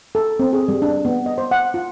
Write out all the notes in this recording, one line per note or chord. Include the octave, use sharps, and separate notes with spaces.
A4
C4
G#4
G3
D4
B3
D#5
C5
F#5
F4